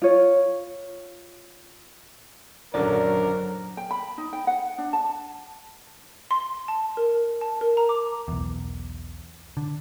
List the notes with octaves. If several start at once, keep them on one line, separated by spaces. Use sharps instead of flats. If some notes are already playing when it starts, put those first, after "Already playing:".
F4 C#5
G#1 F#2 A#2 D3 F#3 A4 A#4 D5
G5
B5
D#4
G5
F#5
D4
A5
C6
A5
A#4
A5
A#4
A#5
D6
B1 E2
D3